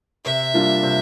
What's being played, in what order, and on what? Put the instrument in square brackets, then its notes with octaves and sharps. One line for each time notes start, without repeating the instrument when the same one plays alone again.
[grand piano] C3 [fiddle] E5
[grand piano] G3 A#3 D4 F4
C3